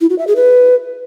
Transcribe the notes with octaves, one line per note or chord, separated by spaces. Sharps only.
E4
F#4
E5
G#4
B4